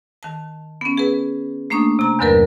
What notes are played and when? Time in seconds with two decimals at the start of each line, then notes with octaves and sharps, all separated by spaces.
0.23 D#3 A5
0.81 B3 C#4
0.97 G#4 B4
1.70 A3 A#3 D4 C#6 D#6
1.99 C3 A#5
2.19 E2 G2 D3 F#3 A#4 B4